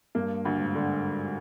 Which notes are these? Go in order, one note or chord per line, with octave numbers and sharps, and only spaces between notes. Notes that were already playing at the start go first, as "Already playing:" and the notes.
G2 A#3
D2
G#2
D3